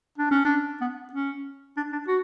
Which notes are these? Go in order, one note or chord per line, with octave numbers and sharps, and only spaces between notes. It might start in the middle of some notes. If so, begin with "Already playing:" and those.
D4
C#4
D4
B3
C#4
D4
D4
F#4